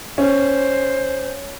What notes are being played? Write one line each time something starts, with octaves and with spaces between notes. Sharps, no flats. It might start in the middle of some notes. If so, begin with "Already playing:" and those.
C#4 C5